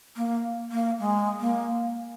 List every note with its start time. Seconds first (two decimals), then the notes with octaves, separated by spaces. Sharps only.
0.17 A#3
0.72 A#3
0.99 G#3
1.40 A#3